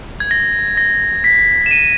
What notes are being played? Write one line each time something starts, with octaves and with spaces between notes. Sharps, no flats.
G#6
A#6
A#6
B6
E7
D#7